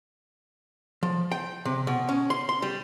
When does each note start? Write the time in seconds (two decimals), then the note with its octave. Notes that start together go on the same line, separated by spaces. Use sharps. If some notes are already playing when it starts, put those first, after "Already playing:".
1.03 F3
1.31 G5
1.65 C3
1.87 B2
2.09 C#4
2.30 C6
2.49 C6
2.62 G3